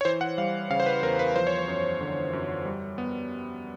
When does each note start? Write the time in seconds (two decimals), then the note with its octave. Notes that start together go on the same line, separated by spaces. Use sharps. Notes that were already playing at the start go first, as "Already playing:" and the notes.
0.01 C#5
0.05 E3 C5
0.21 F#5
0.38 G3 F5
0.70 C#3 F5
0.80 C5
0.86 B4
1.03 E2 A#4
1.19 B4
1.35 F3 C5
1.47 C#5
1.59 C5
1.68 F#2
2.01 D3
2.33 F#2
2.65 G3
2.98 B3